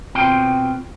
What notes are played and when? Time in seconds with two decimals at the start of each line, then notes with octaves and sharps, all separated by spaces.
0.15 B2 C4 F4 G5